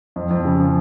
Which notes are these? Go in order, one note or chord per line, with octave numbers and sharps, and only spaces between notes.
F2
F2
C#3
F3